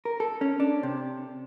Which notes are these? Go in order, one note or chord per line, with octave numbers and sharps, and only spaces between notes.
A#4
A4
C#4
D4
C3